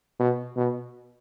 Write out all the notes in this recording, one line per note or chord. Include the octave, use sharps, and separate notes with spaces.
B2
B2